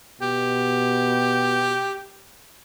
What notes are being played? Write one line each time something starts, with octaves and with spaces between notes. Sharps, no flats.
B2 G4